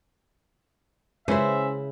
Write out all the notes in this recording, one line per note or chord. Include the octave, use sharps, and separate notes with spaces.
C#3 G#3 C#4 E4 B4 C5 E5